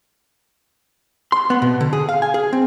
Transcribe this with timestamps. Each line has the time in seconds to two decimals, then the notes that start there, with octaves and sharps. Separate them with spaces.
1.32 C6
1.50 B3
1.62 B2
1.81 D3
1.93 G#4
2.09 F5
2.22 G#5
2.34 G#4
2.53 C4